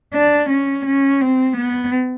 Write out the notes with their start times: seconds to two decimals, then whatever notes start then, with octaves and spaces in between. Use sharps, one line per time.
0.14 D4
0.50 C#4
0.86 C#4
1.21 C4
1.57 B3